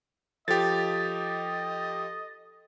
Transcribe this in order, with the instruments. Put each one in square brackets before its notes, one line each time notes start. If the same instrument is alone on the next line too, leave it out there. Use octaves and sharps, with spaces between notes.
[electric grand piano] F3 G4 [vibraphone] A4 [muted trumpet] D#5 [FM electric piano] A6